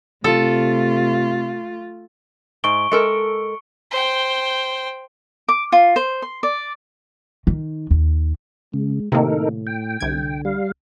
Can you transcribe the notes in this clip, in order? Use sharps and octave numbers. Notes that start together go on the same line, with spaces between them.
C3 A3 F4 A4
G#2 C#6 D7 G7
G#3 A4 A#4 C#7
C5 G5
D6
F4
C5
C6
D5
D#3
D#2
C#3 G#3
A2 C3 D#3 A#3 D#4 A4 A#4
G5
C2 D3 G#6
G3 F5